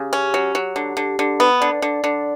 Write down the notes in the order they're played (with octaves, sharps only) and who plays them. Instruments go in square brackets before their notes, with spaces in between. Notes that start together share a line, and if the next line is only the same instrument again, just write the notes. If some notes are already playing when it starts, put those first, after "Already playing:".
Already playing: [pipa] C#3 [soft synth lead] G4
[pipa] C#4
F#3
F#3
D3
D3
D3
B3
[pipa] D3 [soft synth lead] D5
[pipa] D3
D3